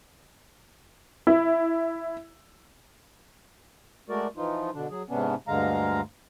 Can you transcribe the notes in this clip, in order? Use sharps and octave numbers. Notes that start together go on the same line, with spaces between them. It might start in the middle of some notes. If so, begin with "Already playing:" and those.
E4
G#3 A3 F#4 A#4 D5
E3 F3 D#4 F4
B2 D3 D4
F#3 G#4
G#2 C3 B3 C#4 D4
D2 G2 D3 G#3 F5 A#5